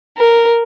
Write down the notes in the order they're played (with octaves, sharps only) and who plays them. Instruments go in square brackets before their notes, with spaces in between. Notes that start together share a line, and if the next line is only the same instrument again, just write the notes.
[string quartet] A#4